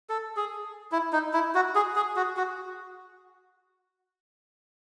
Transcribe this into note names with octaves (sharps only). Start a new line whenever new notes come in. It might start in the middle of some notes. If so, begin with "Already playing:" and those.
A4
G#4
E4
D#4
E4
F#4
G#4
G#4
F#4
F#4